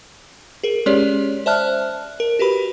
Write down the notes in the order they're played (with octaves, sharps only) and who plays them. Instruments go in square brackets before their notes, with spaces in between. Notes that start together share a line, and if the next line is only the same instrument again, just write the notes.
[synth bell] G#4 A#4
G#3 C#4 G4 G#4 C#5 D5
C5 D5 E5 A5 F6 F#6
A#4
F#4 G4 B4 B5